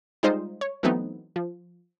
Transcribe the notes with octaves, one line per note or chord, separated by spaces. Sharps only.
G3 G#3 D#4 F4 C5 D#5
C#5
E3 F#3 A3 B3 C4 D#4
F3